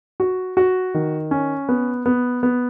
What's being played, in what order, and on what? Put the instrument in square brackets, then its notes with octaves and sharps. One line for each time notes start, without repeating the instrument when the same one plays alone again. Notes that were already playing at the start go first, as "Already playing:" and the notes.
[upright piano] F#4
F#4
D#3
C#4
B3
B3
B3